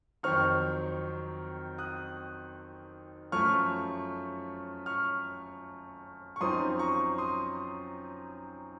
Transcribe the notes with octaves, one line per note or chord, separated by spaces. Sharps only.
F2 D#3 F#3 C4 D#4 C#6 F6
D#6 F#6
F#2 F3 A3 C#6 F6
C#6 F6
C#6
F#2 F3 C4 D#4 C6 D#6
A#5 C#6
C6 D#6